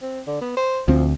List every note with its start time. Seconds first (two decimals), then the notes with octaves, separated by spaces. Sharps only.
0.02 C4
0.27 D3
0.41 B3
0.57 C5
0.88 D2 F3 C4